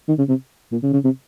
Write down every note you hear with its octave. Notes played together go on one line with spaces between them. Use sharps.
D#3
C#3
C3
A#2
C#3
C#3
C3